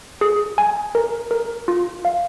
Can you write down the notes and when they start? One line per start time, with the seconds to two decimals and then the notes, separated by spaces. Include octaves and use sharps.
0.21 G#4
0.58 G#5
0.95 A#4
1.31 A#4
1.68 F4
2.05 F5